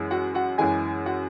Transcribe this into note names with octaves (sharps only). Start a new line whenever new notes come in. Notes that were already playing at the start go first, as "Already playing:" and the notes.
Already playing: F#2 E3 G#3
F#4 F#5
F#4 F#5
F#2 E3 G#3 G#4 G#5
F#4 F#5